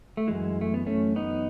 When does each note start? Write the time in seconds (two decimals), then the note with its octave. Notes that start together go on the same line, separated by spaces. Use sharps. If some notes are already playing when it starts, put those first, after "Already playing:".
0.17 A3
0.27 F#2 E3 G#3
0.61 A3
0.74 B3
0.86 A3 C#4
1.16 B3 D#4